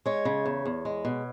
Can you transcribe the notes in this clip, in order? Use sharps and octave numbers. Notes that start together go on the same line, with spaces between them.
G#3 C#5
C#3
E2
E2
G#3
B2